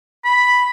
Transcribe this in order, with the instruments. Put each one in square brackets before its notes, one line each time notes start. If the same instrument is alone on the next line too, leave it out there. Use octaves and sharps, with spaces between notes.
[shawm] B5